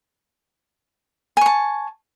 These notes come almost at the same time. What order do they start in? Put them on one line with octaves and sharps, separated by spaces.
G#5 C#6 A5